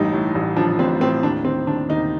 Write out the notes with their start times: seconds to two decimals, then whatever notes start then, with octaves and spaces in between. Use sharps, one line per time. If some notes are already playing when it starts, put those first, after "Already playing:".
Already playing: A1 G2 D#4
0.13 A2
0.35 A1
0.56 F3 D4
0.79 A1 C4
1.01 A2 C4
1.23 D#2 D4
1.45 D#3 C4
1.67 D#3 D4
1.89 D#2 D#4